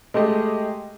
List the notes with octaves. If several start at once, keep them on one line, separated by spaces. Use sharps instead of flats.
G#3 A3 G4 D#5